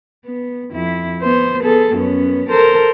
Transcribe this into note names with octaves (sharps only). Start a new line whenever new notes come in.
B3
F2 E4
B3 C5
B3 G#4 A4
F#2 B3 C#4
A4 A#4 C5